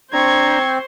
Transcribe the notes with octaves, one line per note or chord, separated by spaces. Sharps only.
C4 D4 C5 A#5 C#6 G#6